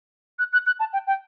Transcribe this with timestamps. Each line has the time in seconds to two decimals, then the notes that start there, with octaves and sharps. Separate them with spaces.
0.39 F#6
0.53 F#6
0.66 F#6
0.80 A5
0.93 G5
1.07 G5